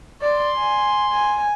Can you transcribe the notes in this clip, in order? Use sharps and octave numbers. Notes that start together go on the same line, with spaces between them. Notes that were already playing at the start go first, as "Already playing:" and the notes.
D5 C6
G#5
G#5